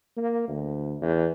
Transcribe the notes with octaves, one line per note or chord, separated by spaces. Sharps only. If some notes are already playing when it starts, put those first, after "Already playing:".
A#3
D2
E2